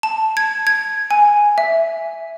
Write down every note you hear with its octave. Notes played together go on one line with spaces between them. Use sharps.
A5
G#6
G#6
G#5
E5